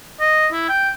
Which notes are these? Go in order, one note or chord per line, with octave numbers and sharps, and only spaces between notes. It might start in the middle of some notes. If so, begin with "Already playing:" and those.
D#5
E4
G5